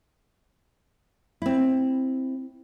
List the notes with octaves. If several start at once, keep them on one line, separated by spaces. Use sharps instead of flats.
C4 E4